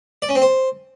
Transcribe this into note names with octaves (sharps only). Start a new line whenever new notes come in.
D5
C#4
C4
C5